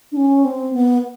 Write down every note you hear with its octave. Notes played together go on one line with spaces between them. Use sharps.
D4
C#4
C4
B3